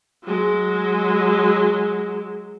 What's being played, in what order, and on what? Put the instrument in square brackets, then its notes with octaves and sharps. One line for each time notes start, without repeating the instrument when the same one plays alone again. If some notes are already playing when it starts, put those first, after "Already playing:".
[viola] F#3 G#3